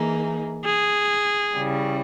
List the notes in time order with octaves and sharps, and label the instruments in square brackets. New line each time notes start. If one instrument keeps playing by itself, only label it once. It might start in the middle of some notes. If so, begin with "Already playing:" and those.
Already playing: [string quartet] E3 A#3 D#4 G#4
[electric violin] G#4
[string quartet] C#3 E3 G3